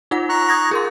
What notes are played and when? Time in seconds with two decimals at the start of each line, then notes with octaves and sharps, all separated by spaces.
0.11 D#4 F4 F#5
0.29 A#5 C#6 F#6
0.49 D#6 G#6 A#6
0.71 G#4 A#4 C6